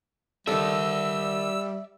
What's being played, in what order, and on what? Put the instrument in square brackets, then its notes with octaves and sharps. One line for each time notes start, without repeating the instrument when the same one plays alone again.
[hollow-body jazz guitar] D#3 A4 [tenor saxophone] G3 [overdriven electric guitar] D5 E5 [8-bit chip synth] E6